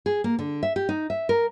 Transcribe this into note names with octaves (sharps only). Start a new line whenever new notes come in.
G#4
A#3
D3
E5
G4
D#4
E5
A#4